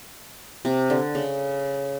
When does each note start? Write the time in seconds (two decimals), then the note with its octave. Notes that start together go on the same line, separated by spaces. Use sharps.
0.65 C3
0.90 D3
1.15 C#3